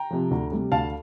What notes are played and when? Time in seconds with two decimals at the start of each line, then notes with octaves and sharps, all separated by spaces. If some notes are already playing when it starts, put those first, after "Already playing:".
Already playing: G5 A#5
0.10 C3 F3
0.31 D2
0.52 C3 G3
0.72 D2 F5 A5